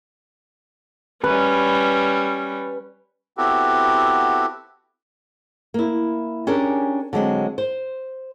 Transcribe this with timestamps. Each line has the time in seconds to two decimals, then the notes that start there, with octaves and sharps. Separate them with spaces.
1.24 G3 C#4 B4
3.37 B3 C4 E4 F#4 G4 A4
5.74 A#3 E4
6.47 C#4 D4 G4 G#4 A#4
7.13 D3 F#3 G#3 C4
7.58 C5